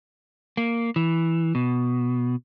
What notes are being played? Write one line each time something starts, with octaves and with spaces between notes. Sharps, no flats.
A#3
E3
B2